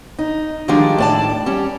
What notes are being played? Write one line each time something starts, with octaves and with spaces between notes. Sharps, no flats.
D#4
D#3 F3 G3 G#3 D4
A2 D5 A5
G3 C#4